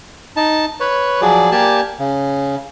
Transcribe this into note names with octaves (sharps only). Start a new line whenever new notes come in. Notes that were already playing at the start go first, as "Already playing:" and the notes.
D#4 A5
B4 C#5
F3 F#3 G#4 D5
A#3 G4 D5 G#5 A5
C#3